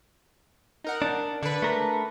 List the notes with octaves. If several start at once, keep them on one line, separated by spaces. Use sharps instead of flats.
D#4 A#4 F#5
D4
D3 D4 B4
A3 A#4